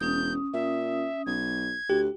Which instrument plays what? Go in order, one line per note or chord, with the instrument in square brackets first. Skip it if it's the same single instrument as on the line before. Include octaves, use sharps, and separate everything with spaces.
[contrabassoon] E1 [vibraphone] C#4 D#6 [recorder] G6
[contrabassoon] A#2 [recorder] E5
[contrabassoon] B1 [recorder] G#6
[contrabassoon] D2 [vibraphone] F#4 [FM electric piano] G4